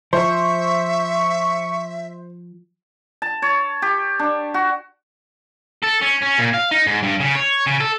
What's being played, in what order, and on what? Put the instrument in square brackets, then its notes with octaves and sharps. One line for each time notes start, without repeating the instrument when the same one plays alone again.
[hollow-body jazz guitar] F3 [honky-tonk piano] C5 [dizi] E5 [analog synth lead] C#6
[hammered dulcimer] A5
C#5
G4
D4
F#4
[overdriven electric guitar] A4
C#4
C#4
A#2
F5
D#4
G#2
G2
C#3
C#5
C#3
A4